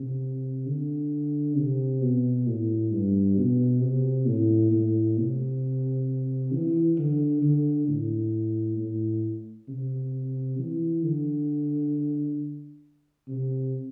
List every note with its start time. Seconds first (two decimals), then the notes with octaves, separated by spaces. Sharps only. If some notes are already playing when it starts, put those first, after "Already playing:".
Already playing: C3
0.66 D3
1.57 C3
2.02 B2
2.47 A2
2.92 G2
3.37 B2
3.82 C3
4.27 A2
4.72 A2
5.18 C3
6.52 E3
6.98 D3
7.43 D3
7.88 A2
8.78 A2
9.69 C3
10.59 E3
11.03 D3
13.28 C3